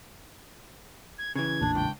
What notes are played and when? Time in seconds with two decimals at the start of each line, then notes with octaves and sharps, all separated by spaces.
1.18 G#6
1.36 C#3 E3 G#6
1.61 A1 E2 A#2 D4
1.75 C#2 G5